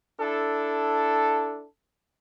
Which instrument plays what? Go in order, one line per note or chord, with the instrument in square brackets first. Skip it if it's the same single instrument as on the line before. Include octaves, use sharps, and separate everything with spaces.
[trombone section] D4 E4 A4